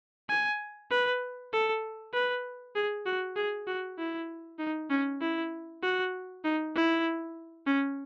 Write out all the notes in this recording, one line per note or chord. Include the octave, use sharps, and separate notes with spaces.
G#5
B4
A4
B4
G#4
F#4
G#4
F#4
E4
D#4
C#4
E4
F#4
D#4
E4
C#4